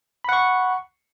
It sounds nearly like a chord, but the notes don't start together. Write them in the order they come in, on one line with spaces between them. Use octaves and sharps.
B5 F#5 C#6